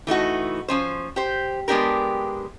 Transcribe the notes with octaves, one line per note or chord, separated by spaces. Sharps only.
E3 A3 D#4 F#4
F3 C#4 C5
G4 C5
G#3 B3 D4 G4 A#4